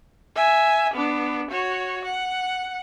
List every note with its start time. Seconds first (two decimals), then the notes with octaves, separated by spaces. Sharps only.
0.35 E5 G#5
0.94 B3 D4
1.50 F#4 C#5
2.05 F#5